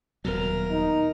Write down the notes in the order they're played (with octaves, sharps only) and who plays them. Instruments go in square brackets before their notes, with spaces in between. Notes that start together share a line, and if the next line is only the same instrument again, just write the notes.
[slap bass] D#1 B2 F#3 [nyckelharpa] A#4
[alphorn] D#4